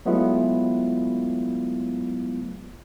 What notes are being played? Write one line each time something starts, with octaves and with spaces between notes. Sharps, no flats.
F#3 G#3 A3 B3 E4 F4